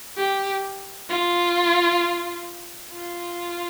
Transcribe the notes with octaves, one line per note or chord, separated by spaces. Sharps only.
G4
F4
F4